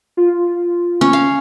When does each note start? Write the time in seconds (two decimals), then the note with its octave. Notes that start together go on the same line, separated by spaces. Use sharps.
0.17 F4
1.01 C#4
1.13 F5